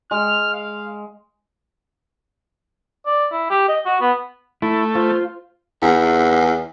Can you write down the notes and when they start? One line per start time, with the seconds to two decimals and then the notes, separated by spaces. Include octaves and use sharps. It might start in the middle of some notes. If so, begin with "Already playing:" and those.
0.11 G#3 F6
0.53 F5
3.06 D5
3.32 E4
3.50 G4
3.68 D#5
3.86 F#4
4.00 B3
4.62 A3 E4
4.95 F4 C5
5.82 E2